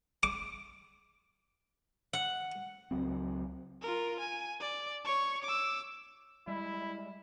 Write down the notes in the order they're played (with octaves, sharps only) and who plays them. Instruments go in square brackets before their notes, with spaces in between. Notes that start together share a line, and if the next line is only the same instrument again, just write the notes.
[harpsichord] D6
[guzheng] F#5
[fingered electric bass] C#2 F#3 C4
[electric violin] F4 A#4
G#5
D5
C#5 C#6
D6 E6
[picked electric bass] G3 G#3 [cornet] E4